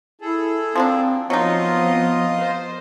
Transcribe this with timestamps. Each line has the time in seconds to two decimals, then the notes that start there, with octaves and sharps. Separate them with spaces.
0.21 E4 G#4 A4
0.76 F3 A#3 C4 D4
1.30 F3 F#3 B3 C4 D#4 F4 D#5
2.41 C5